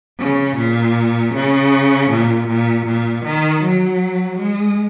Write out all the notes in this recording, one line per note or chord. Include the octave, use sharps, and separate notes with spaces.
C#3
A#2
C#3
A#2
A#2
A#2
D#3
F#3
G#3